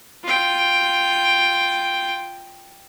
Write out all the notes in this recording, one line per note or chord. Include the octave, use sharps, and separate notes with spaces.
F4 G5